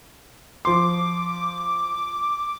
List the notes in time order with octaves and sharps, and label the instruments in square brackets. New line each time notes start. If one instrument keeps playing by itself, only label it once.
[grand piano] F3 C6 [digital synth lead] D6